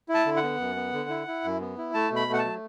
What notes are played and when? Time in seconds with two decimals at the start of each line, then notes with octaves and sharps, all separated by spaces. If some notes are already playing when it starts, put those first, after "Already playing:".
0.09 E4
0.14 A5
0.26 D3
0.36 F#5
0.43 B3
0.60 F#2
0.76 B3
0.93 D3
1.10 E4
1.27 E4
1.44 F#2
1.61 B3
1.78 E4
1.94 A3 A5
2.10 B2
2.16 B5
2.28 A3
2.33 F#5
2.39 A5
2.45 F#3